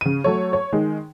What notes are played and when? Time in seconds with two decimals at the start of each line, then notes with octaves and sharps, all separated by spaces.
0.01 C#3 D#7
0.24 F#3 A3 C#5
0.53 C#5
0.73 D#3 G#3